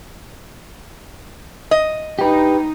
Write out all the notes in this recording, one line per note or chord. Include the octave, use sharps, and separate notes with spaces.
D#5
D#4 G4 B4